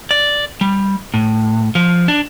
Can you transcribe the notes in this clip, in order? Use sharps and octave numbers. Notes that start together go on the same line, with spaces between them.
D5
G3
A2
F3
D4